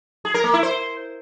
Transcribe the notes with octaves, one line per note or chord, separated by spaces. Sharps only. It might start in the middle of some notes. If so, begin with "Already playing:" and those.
G#4
A#4
A#3
E4
C5